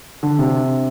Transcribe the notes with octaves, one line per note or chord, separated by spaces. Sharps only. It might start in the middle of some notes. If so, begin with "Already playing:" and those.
D3
C3